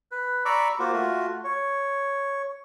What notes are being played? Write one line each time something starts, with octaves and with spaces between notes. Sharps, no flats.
B4
D5 A#5 B5 C#6 D6 E6
A#3 F4 F#4 C5
A3 F4 F#4
C#5